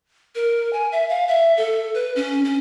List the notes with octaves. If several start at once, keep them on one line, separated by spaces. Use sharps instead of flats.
A#4
G#5
E5
F5
E5
A4
B4
C#4
C#4